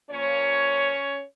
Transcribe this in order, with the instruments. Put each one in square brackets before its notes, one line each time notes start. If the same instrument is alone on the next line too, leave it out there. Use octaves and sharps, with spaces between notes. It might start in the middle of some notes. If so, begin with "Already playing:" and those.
[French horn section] A#2 F3 A#3 C#4 C#5